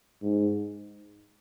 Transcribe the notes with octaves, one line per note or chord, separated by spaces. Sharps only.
G#2